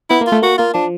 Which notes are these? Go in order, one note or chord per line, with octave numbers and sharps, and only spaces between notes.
B3 E4
A#3
F4
A3
A#3 F#4
A#3 F4
F3 D4